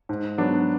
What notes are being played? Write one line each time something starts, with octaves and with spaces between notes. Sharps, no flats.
G#2
F#3 B3 D4